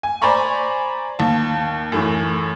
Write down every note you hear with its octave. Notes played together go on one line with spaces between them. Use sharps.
G#5
C5 D5 G#5 A#5 B5 C#6
D#2 A5
F#2 A2 E3